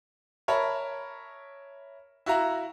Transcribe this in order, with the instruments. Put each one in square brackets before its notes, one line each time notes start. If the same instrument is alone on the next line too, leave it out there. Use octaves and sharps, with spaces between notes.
[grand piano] A#4 C#5 E5 A5 B5
E4 F#4 F5 A#5